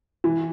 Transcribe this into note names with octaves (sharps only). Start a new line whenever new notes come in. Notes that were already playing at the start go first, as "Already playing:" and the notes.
E3